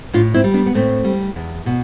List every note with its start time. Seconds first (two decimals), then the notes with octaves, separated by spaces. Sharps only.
0.13 A2 D4 F4
0.34 C4 E4
0.44 G3
0.54 B3 D4
0.66 B3
0.74 A2 A3 C4
1.04 G3
1.36 E2
1.66 B2